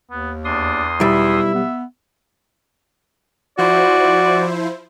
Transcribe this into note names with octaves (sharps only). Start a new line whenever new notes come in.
D#2 B3
E2 D4 C6 D#6
B1 G3 E4 E5
B3
F3 E4 F#4 C5 D5